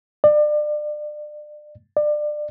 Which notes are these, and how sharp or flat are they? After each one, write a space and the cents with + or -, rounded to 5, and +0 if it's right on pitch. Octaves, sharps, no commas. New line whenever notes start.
D5 +30
D5 +25